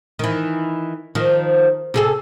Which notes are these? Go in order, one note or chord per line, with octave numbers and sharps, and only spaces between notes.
D#3 E3
D#3 F3
C3 G#4 A4